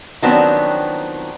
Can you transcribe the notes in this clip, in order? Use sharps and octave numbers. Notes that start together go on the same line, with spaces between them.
D#3 F3 F#3 B3 C4 D4